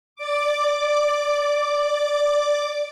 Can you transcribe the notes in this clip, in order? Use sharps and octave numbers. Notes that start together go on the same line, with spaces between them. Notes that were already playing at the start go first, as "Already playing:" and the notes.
D5 D6